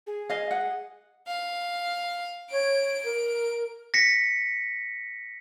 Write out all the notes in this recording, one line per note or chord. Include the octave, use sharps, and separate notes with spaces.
G#4
D#5 F5
F#5
F5
C#5 D7
A#4
A#6 B6 C#7